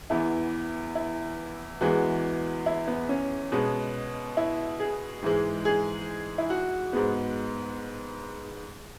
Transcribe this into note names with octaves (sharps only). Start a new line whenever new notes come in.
E2 E3 B3 E4
E4
E2 E3 G#3 B3 F#4
E4
B3
C#4
B2 G#3 B3
E4
G#4
G#2 E3 G#3
G#4
E4
F#4
G#2 G#3 B3